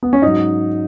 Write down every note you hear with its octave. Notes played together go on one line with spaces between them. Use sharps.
B3
C#4
G#2 F#3 D#4